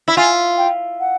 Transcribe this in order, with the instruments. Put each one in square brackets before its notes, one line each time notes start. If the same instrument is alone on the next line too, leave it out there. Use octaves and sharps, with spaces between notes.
[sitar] E4
[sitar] F4 [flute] G#5
[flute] G5
F#5